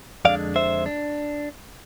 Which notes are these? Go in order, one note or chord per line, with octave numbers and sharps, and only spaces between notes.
F2 D3 G#3 D4 D5 F5
C5 E5
D4